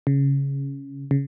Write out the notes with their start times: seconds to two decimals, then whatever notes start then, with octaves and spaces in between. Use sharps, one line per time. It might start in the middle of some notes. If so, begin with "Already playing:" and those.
0.07 C#3
1.11 C#3